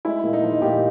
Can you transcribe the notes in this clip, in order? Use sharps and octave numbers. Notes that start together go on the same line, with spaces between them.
G#3 E4
A#2
D#4
F3
A#2 G4